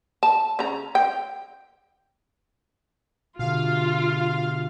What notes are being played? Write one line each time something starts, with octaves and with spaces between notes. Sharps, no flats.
A5
C#3 A#5
G5
B2 D3 F4 F5